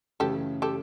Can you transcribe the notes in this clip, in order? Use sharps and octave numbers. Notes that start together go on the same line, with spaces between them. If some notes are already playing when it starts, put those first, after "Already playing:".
F#2 C#3 E3 A3 C#4 G4 A4
G4 A4